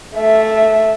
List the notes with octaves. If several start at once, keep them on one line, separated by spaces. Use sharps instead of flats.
A3 E5